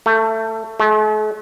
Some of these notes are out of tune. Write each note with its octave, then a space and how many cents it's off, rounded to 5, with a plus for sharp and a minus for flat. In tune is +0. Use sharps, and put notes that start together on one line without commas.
A3 +20
A3 -45